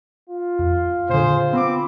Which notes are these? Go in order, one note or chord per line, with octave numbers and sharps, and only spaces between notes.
F4
F2
A#2 D3 G#4 C5
B3 C4 B5 D6